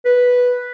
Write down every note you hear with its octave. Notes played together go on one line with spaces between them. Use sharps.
B4